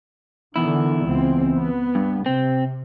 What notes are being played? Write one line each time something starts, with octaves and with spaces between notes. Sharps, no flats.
E2 D3 D#3 E4
C#2 C4
B3
G2
C3 C4